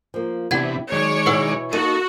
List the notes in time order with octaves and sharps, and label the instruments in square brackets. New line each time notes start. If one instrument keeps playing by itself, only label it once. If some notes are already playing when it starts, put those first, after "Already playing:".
[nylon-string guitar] F3 A#3
[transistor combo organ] C3 E3 B3 [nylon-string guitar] D4 E4 G4 [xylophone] F#5 G#6
[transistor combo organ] D#3 G#3 D5 [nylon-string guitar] F#3 [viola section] C#5
[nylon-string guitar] B2 E3 E4 [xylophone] B4 F#5 E6
[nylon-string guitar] A#3 [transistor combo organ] D#4 A4 [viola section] F#4 [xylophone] D#7